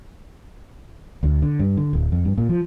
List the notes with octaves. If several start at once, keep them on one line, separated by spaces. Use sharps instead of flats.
D2
D3
G2
D3
D1
F2
G2
A#2
F3